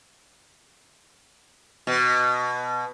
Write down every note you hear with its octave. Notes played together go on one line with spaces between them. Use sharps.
B2